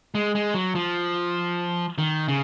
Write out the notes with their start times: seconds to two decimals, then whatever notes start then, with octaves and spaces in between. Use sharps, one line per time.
0.15 G#3
0.35 G#3
0.54 F#3
0.75 F3
1.98 D#3
2.28 C#3